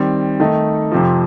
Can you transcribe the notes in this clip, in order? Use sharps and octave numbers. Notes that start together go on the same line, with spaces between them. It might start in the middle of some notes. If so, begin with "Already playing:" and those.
Already playing: D#3 G3 C4
D#3 A3 D#4
F2 C3 F3